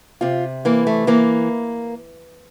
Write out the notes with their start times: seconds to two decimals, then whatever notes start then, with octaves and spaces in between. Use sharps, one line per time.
0.21 C3 F4
0.65 E3 A#3
0.87 A3
1.07 E3 A#3